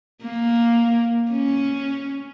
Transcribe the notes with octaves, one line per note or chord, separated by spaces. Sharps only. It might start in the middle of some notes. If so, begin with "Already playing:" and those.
A#3
C#4